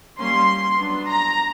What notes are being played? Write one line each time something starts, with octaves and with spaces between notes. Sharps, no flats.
G3 A#3 C#4 C6
F#3 B3 D4
A#5